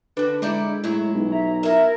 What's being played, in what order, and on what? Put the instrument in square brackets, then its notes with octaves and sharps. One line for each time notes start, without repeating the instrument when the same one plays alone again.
[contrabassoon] D3 [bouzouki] D4 F#4 [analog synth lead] B4
[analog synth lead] G#3 [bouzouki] D#4 E4 D5
[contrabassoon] A2 [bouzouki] F#3 E4
[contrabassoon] B1
[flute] E5 [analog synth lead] A#5
[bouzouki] E4 E5 [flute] A#4